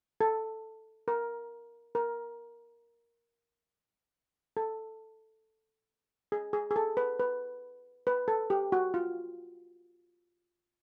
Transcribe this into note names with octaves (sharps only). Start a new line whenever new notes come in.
A4
A#4
A#4
A4
G#4
G#4
G#4
A4
B4
B4
B4
A4
G4
F#4
F4